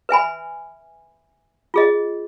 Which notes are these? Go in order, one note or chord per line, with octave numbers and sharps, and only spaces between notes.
B4 E5 G#5 B5
F4 G#4 D#5